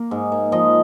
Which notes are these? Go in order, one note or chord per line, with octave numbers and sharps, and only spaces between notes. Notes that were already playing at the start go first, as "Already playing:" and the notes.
Already playing: A#3
G#2
A#3
F3 D#5